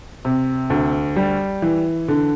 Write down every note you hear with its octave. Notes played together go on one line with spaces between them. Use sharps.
C3
D2
G3
E3
D3